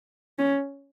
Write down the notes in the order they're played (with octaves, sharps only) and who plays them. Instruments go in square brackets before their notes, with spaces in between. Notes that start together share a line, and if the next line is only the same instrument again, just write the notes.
[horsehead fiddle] C#4